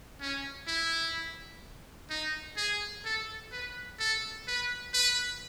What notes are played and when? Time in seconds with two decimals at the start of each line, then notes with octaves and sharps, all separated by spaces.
0.21 C#4
0.67 E4
2.10 D#4
2.57 G#4
3.05 A4
3.52 B4
4.00 A4
4.48 B4
4.94 B4